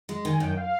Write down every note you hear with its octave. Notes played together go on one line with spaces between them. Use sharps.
G#3
D#3 G#5
F#2 G5
F5